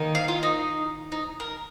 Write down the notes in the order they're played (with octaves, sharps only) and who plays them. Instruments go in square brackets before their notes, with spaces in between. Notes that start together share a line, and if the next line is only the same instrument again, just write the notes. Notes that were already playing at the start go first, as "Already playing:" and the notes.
Already playing: [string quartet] D#3 A#3 D#4
[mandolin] F5
F4
D#4
D#4
A#4